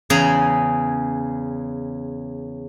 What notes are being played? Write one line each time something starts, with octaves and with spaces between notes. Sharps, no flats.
E2 C#3 G#4 A#5